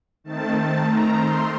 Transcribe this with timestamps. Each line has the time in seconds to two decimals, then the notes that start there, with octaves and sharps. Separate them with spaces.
0.24 D#3 A3 C4 A5
0.54 A5
0.84 A#5
1.14 C6